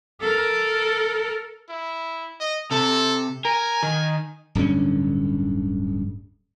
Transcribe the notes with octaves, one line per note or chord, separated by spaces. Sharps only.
A4 A#4
E4
D#5
C3 A4
A#4 G#5
D#3
D1 G2 D3 C#4